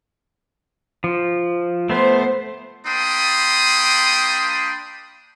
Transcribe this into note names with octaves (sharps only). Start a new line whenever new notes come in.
F3
A3 B3 C5
A#3 D4 G5 B5 C6 D#6